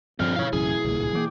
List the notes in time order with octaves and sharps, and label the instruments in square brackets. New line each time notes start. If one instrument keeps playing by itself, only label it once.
[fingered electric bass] G2 F3 [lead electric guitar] D3 C4 [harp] F6
[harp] B2 E4 [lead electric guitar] C#5 F5
[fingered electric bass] A1 F#2 C#3 [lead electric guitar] G#4
[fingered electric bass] D1 C2 A#2
[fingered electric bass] E3 F#3 A#3 [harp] G5 D6 D7